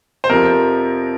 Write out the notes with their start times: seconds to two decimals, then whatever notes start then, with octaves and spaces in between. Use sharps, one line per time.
0.24 C5
0.30 F2 C3 F3 A#4